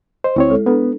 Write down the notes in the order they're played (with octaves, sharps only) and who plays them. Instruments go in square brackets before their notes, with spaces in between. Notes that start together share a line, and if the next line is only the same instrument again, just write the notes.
[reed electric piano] C5 [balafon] D#5
[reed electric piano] D2 C4 C#5 [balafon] E4
[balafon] G#3 A4
[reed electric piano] B3 [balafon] D4 A4 B4